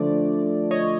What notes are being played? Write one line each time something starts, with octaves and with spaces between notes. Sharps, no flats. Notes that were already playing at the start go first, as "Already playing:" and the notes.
Already playing: D3 F3 A3 D5
C#5 D#5